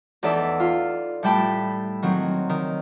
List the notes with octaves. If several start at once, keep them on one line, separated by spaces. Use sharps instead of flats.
E2 D#4 A4 D5 E5
F4
A2 G3 E4 G5 A5 B5
D#3 F#3 C4
D#3